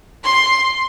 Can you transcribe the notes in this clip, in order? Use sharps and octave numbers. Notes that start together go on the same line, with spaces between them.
C6